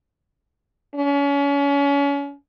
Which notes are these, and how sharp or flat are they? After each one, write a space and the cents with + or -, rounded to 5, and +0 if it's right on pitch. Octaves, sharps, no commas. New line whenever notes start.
C#4 +35